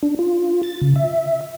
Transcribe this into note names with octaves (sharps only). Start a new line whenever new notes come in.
D4
F4
A6
C#3
E5